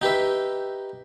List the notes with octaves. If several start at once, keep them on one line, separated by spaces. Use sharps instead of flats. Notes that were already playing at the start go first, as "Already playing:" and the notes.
D#4 G4 B4 E5